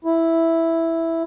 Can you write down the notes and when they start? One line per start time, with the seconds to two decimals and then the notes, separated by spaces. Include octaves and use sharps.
0.05 E4